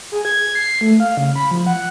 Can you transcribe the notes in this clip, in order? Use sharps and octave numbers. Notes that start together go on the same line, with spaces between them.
G#4
G#6
C7
A3
F5
C#3
B5
F3
F#5